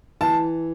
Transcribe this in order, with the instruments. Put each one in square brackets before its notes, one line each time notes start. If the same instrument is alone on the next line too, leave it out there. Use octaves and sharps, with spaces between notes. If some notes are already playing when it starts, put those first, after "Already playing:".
[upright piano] E3 A5